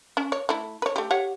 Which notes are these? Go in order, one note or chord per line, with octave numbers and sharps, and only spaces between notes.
C#4
C#5
A3 E4
B4 C#5
A3 G4
G4 C#5 F#5